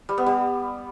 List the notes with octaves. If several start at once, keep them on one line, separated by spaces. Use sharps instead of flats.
G3
B3
G3